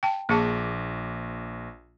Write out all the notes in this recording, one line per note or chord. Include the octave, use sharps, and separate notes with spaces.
G5 A5
A#1 A#3 G#4 A5 D6